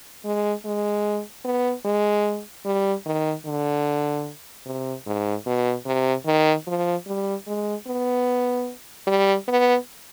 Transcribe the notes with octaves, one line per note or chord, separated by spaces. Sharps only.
G#3
G#3
B3
G#3
G3
D#3
D3
C3
G#2
B2
C3
D#3
F3
G3
G#3
B3
G3
B3